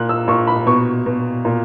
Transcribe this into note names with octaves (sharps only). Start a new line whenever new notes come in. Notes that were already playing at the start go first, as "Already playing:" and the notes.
Already playing: A#2 F#6
E6
A#2 C#6
B5
B2 C#6
B2
A#2